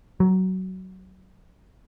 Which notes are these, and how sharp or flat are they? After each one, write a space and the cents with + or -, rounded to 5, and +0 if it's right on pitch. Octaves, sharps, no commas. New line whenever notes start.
F#3 +15